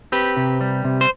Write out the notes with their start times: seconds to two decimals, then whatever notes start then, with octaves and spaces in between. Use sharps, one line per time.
0.12 C4 G4 B4
0.37 C3
0.61 G3
0.85 C3
1.01 C5